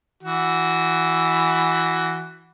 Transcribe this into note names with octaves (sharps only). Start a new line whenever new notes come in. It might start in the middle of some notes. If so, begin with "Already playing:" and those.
E3 F#4